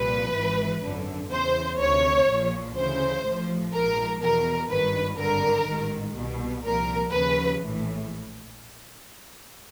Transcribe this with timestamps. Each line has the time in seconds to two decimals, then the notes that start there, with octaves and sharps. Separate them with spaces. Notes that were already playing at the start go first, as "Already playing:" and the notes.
Already playing: C2 A#2 F3 B4
0.34 G#1 G#2 E3
0.82 G#1 F#2 D3
1.30 E2 C#3 E3 C5
1.79 D2 C3 D#3 C#5
2.27 A#1 A#2 F3
2.76 D2 C#3 E3 C5
3.24 A1 A2 F3
3.73 A#1 G#2 F3 A#4
4.21 E2 B2 A#4
4.69 G#1 G2 D#3 B4
5.18 G#1 G2 D3 A#4
5.67 A1 G#2 D#3
6.15 C2 B2
6.64 C2 A#2 F3 A#4
7.12 D#2 C#3 F3 B4
7.61 A#1 A2 E3